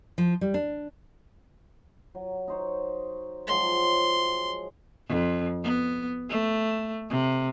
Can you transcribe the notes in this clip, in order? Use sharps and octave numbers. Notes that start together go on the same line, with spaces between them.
F3
G3
D4
F#3
D#4 C5 C#5
F3 F#3 G#3 C6
F2
B3
A3
C3